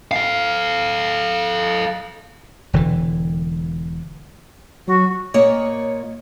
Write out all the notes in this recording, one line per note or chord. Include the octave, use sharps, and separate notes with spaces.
A4 F5
E1 D3 E3
F#3 F#4
A#2 A#3 C#5 D#5